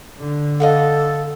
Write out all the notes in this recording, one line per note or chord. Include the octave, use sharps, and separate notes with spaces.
D3
A4 D#5 F5 F#5